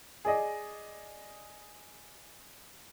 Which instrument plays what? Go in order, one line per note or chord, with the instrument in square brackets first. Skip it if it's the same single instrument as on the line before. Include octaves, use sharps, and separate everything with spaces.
[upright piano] G#4 D5 D#5